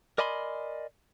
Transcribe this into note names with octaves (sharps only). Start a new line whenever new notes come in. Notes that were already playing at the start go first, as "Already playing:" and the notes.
A#4 D5 D#5 G#5 B5 C6